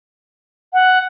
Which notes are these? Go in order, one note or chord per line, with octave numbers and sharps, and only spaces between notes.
F#5